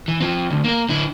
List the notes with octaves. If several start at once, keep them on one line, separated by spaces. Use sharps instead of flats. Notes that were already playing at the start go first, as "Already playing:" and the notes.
E3
F3 C4
D2
A#3 A#4
D3 E4